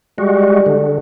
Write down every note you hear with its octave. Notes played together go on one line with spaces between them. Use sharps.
G3 G#3 F#4
D3